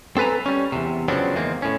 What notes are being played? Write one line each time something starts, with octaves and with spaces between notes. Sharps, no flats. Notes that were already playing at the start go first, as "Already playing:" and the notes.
C4 A4 B4 G#5 A#5
G3 C#4
E2 C3
C#3 F3 F#3 B3 C4 D4
E2 D#3 G#3 A#3 C4
A2 C#4